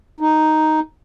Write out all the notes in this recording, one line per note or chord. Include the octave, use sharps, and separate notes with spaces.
D#4